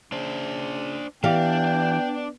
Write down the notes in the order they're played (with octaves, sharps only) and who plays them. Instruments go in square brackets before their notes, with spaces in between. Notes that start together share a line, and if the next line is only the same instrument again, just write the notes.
[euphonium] C#3 [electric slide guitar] D4 C5
[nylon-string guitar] E3 G4 F5 [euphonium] B3 [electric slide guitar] D4 D5 [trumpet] G5